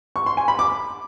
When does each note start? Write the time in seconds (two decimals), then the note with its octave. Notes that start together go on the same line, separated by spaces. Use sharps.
0.16 C#6
0.26 C6
0.37 G#5
0.48 B5
0.59 D6